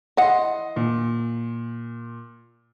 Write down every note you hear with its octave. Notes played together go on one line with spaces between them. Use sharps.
E3 D#5 F#5 C6
A#2